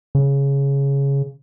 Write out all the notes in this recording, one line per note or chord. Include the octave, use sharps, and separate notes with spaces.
C#3